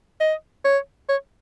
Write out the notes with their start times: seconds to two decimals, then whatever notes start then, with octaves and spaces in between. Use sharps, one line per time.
0.20 D#5
0.65 C#5
1.09 C#5